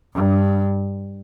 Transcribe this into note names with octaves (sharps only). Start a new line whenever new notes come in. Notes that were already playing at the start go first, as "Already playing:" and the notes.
G2